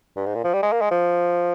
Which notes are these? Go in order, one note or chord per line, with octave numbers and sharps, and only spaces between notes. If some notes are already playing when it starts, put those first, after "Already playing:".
G2
G#2
A#2
F3
G3
G#3
A#3
G#3
F3